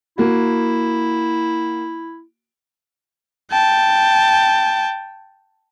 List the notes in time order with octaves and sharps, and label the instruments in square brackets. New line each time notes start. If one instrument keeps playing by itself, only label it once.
[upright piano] A#3 F#4 [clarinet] E4
[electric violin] G5 A5